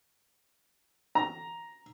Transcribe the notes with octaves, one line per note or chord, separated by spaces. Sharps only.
A#5